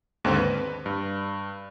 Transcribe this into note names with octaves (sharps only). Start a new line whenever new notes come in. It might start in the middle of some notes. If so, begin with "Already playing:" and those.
D#2 G#2 D3 C4
B4
G2